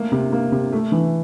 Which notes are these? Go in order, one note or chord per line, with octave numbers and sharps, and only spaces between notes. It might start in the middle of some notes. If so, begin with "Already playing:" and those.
Already playing: A3 A#3
C3
A#3
C3
A3
E3